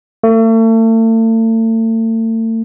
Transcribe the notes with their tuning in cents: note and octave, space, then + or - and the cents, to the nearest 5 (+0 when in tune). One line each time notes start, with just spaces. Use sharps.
A3 +40